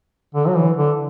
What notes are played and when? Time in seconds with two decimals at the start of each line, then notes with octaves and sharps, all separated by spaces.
0.35 D3
0.48 F#3
0.56 E3
0.77 D3